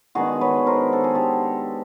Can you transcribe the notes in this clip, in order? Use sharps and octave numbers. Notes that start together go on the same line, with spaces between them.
D#3 G#3 B3 D4 F#4 G#4
B4 C#5
A#4 C5
A4
G#4
G4 A4